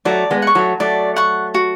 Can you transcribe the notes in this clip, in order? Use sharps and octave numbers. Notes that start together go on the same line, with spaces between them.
F#3 A3 D5
G#3 B3
F#5 C#6
F#3 A3
F#3 A3 D5
F#5 C#6
F#4